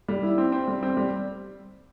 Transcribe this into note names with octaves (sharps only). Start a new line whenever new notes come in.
G3
E4
C4
C4
G3
C4
G3